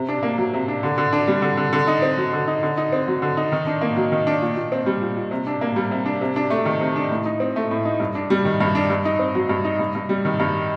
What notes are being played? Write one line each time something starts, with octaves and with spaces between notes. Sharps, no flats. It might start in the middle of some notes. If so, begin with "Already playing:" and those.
Already playing: C3
D4
A#3
F#3
C3
D4
D3
D3
D4
G3
D3
D3
D3
D#4
C4
F#3
D3
D#4
D3
D#4
C4
F#3
D3
D#4
D#3
D4
A#3
F#3
D#3
D4
A#2
A#2
C4
G3
A#2
A#2
C3
D4
A#3
G3
C3
D4
C3
D4
A3
D#3
C3
D4
A2
D#4
C4
A3
A2
D#4
G2
D4
G3
D#3
G2
D4
G2
D#4
C4
F#3
G2
D#4
G2
G2
G3
D#3
G2